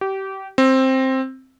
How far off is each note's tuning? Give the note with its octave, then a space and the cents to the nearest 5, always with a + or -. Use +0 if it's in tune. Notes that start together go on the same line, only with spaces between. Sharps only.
G4 -25
C4 +10